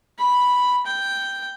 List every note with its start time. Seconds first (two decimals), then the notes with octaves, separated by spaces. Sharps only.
0.19 B5
0.86 G5